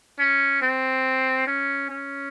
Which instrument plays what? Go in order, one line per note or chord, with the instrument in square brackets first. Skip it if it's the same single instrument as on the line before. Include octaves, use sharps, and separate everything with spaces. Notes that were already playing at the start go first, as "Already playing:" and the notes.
[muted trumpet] C#4
C4
C#4
C#4